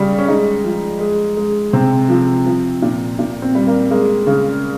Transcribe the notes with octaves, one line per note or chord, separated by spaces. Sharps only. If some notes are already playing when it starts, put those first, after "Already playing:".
Already playing: C#3 G3
C#4
G#3 D#4
F3
G#3
G#3
C3 C4
F3
F3
A#2
A#2
C4
G3
A#3
G#3 A#3
C#3